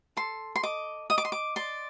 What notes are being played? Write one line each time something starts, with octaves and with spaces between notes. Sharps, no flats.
A4 C6
C6
D#5 D6
D#5 D#6
D6
C6
D6
D5 C6